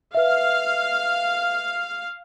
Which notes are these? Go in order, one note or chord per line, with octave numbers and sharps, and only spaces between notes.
B4 E5 F5